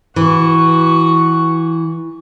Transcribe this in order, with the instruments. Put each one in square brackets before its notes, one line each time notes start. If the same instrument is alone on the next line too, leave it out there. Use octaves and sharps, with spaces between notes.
[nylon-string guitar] E3 [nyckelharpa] F#4 C#6